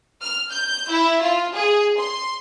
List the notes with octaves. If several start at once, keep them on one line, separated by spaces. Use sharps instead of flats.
F6
G6
E4
F4
G#4
C6